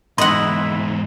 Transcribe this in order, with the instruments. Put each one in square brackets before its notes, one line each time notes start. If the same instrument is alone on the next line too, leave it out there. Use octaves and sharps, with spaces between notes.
[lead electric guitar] E2 G#2 [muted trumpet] E4 [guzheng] D#5 F#5 [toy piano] C6